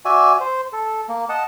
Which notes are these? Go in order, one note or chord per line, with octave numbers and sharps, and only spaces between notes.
F#4 D5 E5 G#5
C5
A4
A#3
D#5 F#5 A5